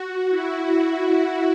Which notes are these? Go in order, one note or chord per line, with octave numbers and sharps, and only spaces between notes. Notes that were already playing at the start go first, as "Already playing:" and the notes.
Already playing: F#4
E4